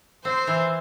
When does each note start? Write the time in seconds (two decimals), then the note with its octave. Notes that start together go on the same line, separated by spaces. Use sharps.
0.24 C4 C5
0.47 E3